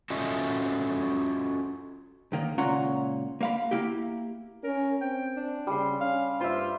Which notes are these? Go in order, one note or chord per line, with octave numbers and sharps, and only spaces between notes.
C#4 F4 F#4 A4 D#5 E5
B1 D#3 A#3
C#2 A#2 C#4 F4 F#5 A#5
A#3 F5 B5
A#3 E4 G4
C#4 A#4
C4 G5
D4
C#3 G3 C6
C#4 F5
G2 F4 C5 E5